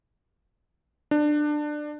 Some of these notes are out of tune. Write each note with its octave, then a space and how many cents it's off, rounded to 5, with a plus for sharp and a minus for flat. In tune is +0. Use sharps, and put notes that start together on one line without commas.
D4 +20